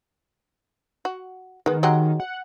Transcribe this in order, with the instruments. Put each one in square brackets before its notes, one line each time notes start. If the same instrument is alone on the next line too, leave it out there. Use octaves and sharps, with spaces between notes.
[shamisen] F#4
[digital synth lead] D#3 [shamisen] G#3 B3
[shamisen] F#3 G#3 G4
[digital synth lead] F#5